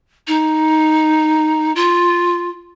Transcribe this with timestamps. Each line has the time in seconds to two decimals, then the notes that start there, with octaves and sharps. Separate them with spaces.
0.27 D#4
1.76 F4